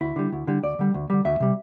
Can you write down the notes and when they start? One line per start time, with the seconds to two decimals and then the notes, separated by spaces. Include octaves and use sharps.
0.01 D2 E4
0.16 D3 G3
0.32 D2
0.47 D3 G3
0.63 D2 D5
0.79 D3 G3
0.94 D2
1.10 D3 G3
1.25 D2 E5
1.40 C3 G3